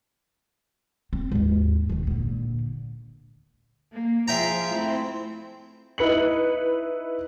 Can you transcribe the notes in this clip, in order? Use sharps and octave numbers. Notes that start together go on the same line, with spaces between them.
C4
D#2 G#2
C3 D#3
A#2 D3
A#3
F3 F4 G#4 E5 G5 A#5
A3 C4 E4
D#4 E4 B4 C#7 F#7